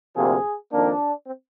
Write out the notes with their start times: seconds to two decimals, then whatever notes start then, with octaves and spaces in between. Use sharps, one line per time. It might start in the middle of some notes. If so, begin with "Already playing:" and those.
0.15 D2 C3 F3 A#3 G#4
0.71 F2 D#3 A#3 D4
1.27 C4